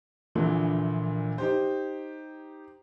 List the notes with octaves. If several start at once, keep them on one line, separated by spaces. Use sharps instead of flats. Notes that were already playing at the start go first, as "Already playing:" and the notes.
A#1 A#2 D3 E3
D#4 G4 C5